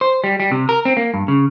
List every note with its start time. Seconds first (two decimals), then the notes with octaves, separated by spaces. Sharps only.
0.01 C5
0.24 G3
0.40 G3
0.52 C3
0.69 A#4
0.85 C4
0.97 A#3
1.14 G2
1.28 C#3